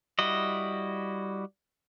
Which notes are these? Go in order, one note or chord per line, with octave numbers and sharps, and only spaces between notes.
G3 E4 F#4 D#5